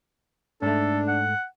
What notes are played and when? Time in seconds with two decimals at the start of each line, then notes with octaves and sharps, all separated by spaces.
0.62 G#2 A3 D4 A4
1.08 F#5